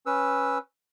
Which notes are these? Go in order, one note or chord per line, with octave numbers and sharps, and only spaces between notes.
C#4 B4 E6